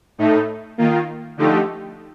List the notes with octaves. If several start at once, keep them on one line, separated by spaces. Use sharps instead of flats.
A2 A3 D#4
D#3 A#3 F4
D3 F3 A3 D#4 G4